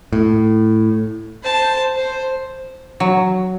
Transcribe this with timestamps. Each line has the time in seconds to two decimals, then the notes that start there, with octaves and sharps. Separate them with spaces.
0.13 A2
1.43 C5 A5
1.96 C5
3.00 F#3